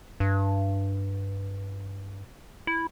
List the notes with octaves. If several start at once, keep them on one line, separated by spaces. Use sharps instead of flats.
G2
E4